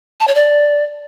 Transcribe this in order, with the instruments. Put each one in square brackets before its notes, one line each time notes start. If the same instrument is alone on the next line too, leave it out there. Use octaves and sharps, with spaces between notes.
[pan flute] A5
C#5
D5